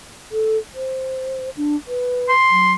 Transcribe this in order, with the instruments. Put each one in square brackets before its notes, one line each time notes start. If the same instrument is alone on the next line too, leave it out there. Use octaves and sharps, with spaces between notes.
[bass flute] A4
C5
D4
B4
[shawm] C6
[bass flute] F#3